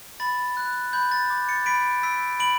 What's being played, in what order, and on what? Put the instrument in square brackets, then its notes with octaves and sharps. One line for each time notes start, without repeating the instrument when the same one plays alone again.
[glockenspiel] B5 A6
F#6
B5 G6
A6
D6
A6 C#7
B5 B6 D7
E6 B6 D7
B5 D7 F#7